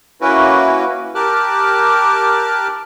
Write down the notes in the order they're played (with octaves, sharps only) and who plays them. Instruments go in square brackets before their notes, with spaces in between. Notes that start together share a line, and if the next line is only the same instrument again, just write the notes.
[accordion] A#3 C#4 E4 F#4 B4
G4 A#4 A5 D6 F6 F#6